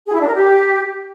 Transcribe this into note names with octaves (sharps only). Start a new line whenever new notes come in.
G#4
E4
D4
A#4
G4